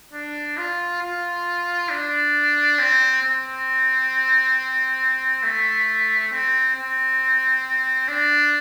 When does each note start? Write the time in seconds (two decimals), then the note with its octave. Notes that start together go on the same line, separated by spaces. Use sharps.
0.13 D4
0.57 F4
1.02 F4
1.90 D4
2.79 C4
3.22 C4
5.43 A3
6.32 C4
6.75 C4
8.08 D4